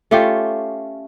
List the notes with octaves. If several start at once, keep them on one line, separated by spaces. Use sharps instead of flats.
A3 C#4 F4 G4